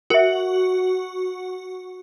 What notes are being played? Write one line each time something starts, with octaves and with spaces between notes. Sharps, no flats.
F#4 A#4 E5